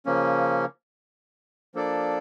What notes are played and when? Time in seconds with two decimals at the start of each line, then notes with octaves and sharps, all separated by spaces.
0.06 C#3 F3 A#3 C#4
1.75 F3 A#3 D4 A4 D5